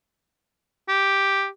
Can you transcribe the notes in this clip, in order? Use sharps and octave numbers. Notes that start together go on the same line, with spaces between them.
G4